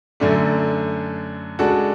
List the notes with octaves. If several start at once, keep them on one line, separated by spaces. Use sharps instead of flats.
F#2 D3 A3 D4
C#3 G#3 D4 F#4 A4